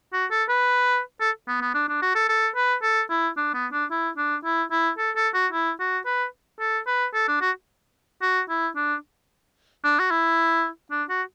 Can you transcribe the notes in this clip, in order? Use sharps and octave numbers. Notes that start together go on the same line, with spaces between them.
F#4
A4
B4
A4
B3
B3
D4
D4
F#4
A4
A4
B4
A4
E4
D4
B3
D4
E4
D4
E4
E4
A4
A4
F#4
E4
F#4
B4
A4
B4
A4
D4
F#4
F#4
E4
D4
D4
F#4
E4
D4
F#4